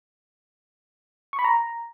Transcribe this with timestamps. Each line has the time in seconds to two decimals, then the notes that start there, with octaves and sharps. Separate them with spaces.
1.33 C#6
1.39 B5
1.44 A#5